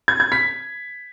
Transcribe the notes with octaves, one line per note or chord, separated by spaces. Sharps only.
G#6
G#6
B6